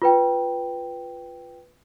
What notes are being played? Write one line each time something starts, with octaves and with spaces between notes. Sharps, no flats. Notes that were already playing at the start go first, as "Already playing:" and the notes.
F4 B4 G5